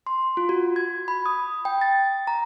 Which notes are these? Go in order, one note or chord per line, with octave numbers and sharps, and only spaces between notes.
C6
F4
F#4
G#6
B5
D#6
G5
A6
A#5